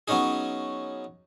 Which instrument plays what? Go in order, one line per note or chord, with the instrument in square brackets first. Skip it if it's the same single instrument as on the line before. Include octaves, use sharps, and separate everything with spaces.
[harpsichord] F#3 B3 C#4 D#4 G#4